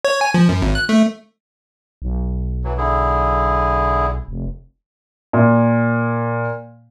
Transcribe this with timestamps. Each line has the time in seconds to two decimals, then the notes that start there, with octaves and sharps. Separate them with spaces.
0.05 C#5
0.21 G#5
0.34 F3
0.49 F#2
0.62 G#1
0.75 F#6
0.89 A3
2.02 B1
2.64 E3 F#3
2.78 D3 E4 G#4
4.28 F1
5.33 A#2